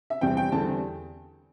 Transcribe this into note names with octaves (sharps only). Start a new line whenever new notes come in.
E5
E2 C3 G3 C4 G5
G5
E2 D3 G3 C4 A5